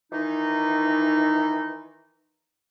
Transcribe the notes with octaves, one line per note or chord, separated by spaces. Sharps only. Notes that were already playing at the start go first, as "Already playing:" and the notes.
D#3 E3 D#4